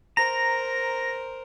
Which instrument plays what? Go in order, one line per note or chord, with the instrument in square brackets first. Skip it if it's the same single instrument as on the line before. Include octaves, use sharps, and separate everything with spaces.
[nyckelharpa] A#4 C5 [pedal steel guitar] A#5 [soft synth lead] A#6